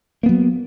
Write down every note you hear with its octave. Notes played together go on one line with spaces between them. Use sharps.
F#3 A#3 B3